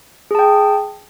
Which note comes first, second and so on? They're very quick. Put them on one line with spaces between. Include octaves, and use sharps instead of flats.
G#4 A5 G5